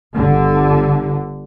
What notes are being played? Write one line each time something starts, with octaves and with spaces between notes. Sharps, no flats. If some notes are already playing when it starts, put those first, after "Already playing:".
G1 D3